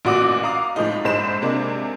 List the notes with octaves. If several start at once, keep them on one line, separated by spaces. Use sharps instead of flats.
A1 A#2 F#4 D5 D6 D#6
F5 A#5 D6 D#6
A2 F3 G#3 D#4
A#1 G#2 G#3 C5 B5 E7
C3 G#3 A#3 D4